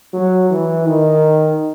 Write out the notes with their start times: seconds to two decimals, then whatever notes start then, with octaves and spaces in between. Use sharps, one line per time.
0.13 F#3
0.50 E3
0.87 D#3